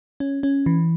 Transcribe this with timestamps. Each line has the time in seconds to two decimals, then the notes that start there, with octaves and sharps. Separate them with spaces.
0.20 C#4
0.43 C#4
0.66 E3